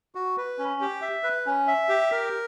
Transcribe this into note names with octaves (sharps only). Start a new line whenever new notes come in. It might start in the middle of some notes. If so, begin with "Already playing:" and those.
F#4
B4
C#4
G4
E5
B4
C#4
E5
G4
A#4